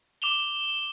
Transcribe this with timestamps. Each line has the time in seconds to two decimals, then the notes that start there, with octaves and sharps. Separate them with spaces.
0.22 D6 E7 F7 G7